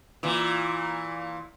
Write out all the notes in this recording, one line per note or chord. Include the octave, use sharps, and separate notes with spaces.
A#2 E3